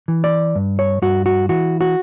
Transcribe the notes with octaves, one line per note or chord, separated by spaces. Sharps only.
E3
D5
G2
C#5
G2 F#4
F#4
E3 F#4
F#4